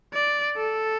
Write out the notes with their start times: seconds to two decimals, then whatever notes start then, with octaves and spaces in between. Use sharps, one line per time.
0.13 D5
0.58 A4